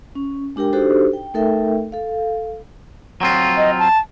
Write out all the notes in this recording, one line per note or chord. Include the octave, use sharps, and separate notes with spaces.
C#4
G#3 D4 G4 A#4 G5
D4 D#4 F#4 G4 A4 C5
G5
A3 D#4 A4 A#4 E5 G5
A4 F5
F#3 C4 F4
D#5
A5